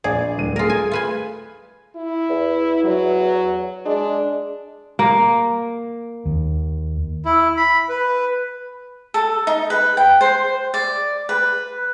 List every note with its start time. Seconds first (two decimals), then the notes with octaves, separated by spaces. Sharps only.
0.04 A#1 G#4 D5
0.37 D1 G3 D#7
0.56 A3 F4 G#4 A#4
0.70 G#5
0.91 F4 B4 G#5
1.96 E4
2.30 E2
2.84 F#3
3.86 G#3 D4
4.99 A#3
6.25 D#2
7.25 E4
7.57 B5
7.89 B4
9.14 A4
9.47 D#4
9.70 B4
9.97 G5
10.21 C5
10.74 D5
11.29 B4